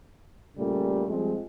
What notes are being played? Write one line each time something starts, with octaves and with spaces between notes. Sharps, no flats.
A#2 C#3 G3 A3
F3 G3 G#3 C4